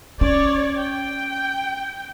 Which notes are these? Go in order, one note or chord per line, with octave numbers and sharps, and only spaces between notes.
C#4 C#5 D5
G5